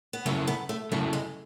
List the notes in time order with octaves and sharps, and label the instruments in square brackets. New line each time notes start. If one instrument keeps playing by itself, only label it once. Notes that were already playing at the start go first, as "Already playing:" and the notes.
[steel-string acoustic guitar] B3
[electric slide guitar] C#3 F#3 C#4 E4 [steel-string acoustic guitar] A3
[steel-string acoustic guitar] B3
A3
[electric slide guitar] C#3 F#3 C#4 E4 [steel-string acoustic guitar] A3
[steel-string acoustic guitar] G#3